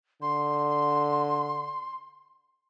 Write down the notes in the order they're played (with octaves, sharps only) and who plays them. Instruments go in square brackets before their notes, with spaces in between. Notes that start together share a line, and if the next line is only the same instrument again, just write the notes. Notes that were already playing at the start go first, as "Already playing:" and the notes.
[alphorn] D3 [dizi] C6